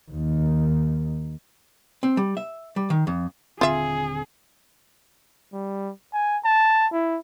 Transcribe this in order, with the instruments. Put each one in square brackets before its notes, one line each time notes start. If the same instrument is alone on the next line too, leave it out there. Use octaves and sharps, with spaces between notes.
[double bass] D#2 D#3
[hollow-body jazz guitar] C4
G3
E5
G3
D#3
F2
[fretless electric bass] D#1 D3 C4 [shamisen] F4 E5 [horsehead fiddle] G#4
[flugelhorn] G3
G#5
A5
E4